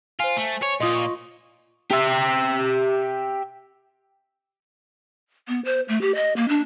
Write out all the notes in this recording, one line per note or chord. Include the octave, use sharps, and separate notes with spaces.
F4 C5 G#5
A3
C#5
A#2 F4 D#5 C6 D#6
C#6
G4 E5
B3
C5
A3
G4
D#5
A#3
D4